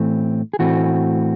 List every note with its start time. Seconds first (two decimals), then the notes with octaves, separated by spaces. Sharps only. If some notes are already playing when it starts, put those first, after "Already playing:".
Already playing: A2 E3 A3 C4
0.53 G#4
0.59 A2 E3 A3 C4 F#4